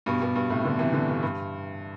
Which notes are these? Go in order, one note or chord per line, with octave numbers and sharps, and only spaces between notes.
G2 B2
G2 B2
G2
A2 C3
B2 D3
C3 E3
B2 D3
G2
G2